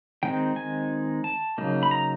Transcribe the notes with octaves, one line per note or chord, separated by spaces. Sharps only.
D#3 G#3 C4 D#4 G5
G#5
A5
C#3 F#3 A#3 D#4
B5
A#5